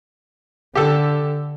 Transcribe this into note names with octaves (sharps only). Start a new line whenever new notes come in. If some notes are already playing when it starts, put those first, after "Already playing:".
D3 G4 A4